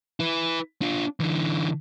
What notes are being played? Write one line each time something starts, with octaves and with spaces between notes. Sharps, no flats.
E4 B4
D4 F4
D3 E3